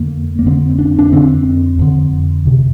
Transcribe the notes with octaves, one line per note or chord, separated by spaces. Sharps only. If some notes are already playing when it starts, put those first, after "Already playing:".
Already playing: F2 D3 A#3
A#3
F2 D3 C4
D4
D4
F2 D3 C4
F2 D3
F2 C3